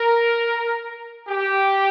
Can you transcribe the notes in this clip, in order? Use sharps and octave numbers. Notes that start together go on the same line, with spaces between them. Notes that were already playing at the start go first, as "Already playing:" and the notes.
Already playing: A#4
G4